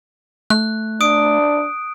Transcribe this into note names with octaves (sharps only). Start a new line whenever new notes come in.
A3 F#6
D4 D#6 D7